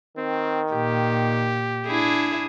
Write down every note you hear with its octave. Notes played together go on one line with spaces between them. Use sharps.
D#3 C4
A#2 G4
D4 E4 G#4